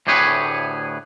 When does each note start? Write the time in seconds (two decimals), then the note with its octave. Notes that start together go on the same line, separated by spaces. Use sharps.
0.07 D2 A2 G4 G#4 B4 C#5